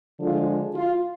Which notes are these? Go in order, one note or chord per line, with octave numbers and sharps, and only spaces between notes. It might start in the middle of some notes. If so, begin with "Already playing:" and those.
D3 F3 G#3 F4
F4